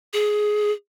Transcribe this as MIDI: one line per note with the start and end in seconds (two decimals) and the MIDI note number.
0.13 0.72 68